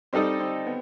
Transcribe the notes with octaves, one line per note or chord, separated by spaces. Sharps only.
G3 C4 D#4 A4 D#5
C4
B3